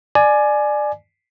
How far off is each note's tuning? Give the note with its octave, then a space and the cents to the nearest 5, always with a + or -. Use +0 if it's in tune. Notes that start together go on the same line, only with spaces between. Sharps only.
D5 +20 G#5 +20